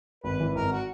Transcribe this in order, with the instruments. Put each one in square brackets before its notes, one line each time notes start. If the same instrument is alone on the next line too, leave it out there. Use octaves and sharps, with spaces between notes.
[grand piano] G#1 [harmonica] B4
[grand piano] E3
[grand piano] G#1 [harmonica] A#4
[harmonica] F#4